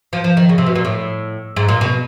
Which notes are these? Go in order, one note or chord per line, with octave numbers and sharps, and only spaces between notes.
F3
F3
D#3
C#3
C3
B2
A#2
A2
G#2
A#2
B2